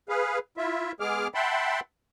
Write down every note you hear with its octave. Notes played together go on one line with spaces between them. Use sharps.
G#4 B4 F5
E4 F4 E5
G#3 B3 G#4 D6 F6
E5 F#5 G5 A5 B5 C6